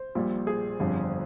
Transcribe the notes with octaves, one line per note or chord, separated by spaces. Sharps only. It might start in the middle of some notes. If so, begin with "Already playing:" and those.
Already playing: C5
A#1 A#2 G3
G#4
G1 F2 D3 G3